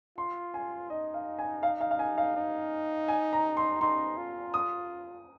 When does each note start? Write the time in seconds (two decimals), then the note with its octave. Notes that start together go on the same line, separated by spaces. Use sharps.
0.17 F4 C6
0.54 G#5
0.90 D#4 D#5
1.14 F5
1.39 G#5
1.63 F5
1.81 F5
1.91 F5
1.99 G#5
2.18 F5
2.36 D#4
3.08 G#5
3.33 A#5
3.57 C6
3.81 D#4 C6
4.17 F4
4.54 D#6